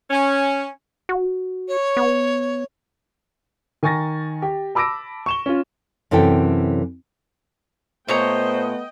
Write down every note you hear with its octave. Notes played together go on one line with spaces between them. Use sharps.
C#4
F#4
C#5
B3
D#3 G#5 C#6 A6 A#6
G4
A5 B5 D6 E6 A#6 D7
C#6 E7 G7
C#4 F4
F#2 C3 E3 C#4 A4 G5
A#2 A3 B3 C5 C#5 D#5 G5 A#5